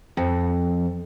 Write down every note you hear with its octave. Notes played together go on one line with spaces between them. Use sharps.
F2